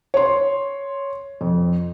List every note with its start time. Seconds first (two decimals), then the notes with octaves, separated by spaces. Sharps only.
0.14 C#5 C6
1.41 F2